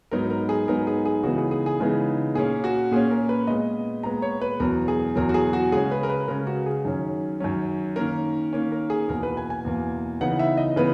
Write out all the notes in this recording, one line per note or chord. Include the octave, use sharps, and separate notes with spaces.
G#2 F#3 B3 D#4 A#4
A#4
G#4
G#2 F#3 B3 D#4 A#4
G#4
G#4
C#3 E3 G#3 B3 D#4 F#4
G#4
G#4
G#4
C#3 E3 G#3 B3 D#4
A#2 A#3 C#4 G#4
F#4
A#2 A#3 C#4 G#4
A#4
B4
A#2 G#3 B3 D#5
A#2 G#3 B3 A#5
C#5
B4
E2 B2 F#3 A#4
G#4
E2 B2 F#3 A#4
F#4
G#4
F#4
C#3 G#3 C#4 G#4
B4
A#4
B4
C#3 G#3 C#4 A#4
F#4
G#4
F#2 D#3 F#3 C#4
F#2 D#3 F#3 C#4
D#3 A#3 C#4 A#4
D#3 A#3 C#4
A#4
G#4
E2 B2 A#3 A#4
B4
G#5
G#5
E2 B2 A#3
C#3 E3 B3 D#4 F#5
E5
D#5
C#3 E3 B3 B4